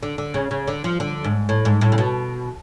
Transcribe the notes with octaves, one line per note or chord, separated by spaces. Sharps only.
D3
D3
C#3
C#3
D3
F3
D3
G#2
A2
G#2
A2
C#3
B2